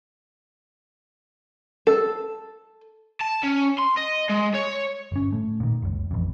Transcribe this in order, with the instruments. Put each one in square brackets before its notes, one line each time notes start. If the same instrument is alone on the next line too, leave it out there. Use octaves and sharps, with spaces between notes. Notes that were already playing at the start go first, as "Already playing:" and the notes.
[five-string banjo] A4
[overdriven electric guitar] A5
C#4
C6
D#5
G#3
C#5
[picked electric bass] G1 C#4
A2 A3
A#2 D#3
F#1 C#2
A1 F2